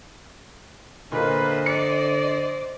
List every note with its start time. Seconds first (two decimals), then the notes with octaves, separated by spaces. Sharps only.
1.12 A#2 D3 A#3 B4 C5 D#5
1.66 D5 C#7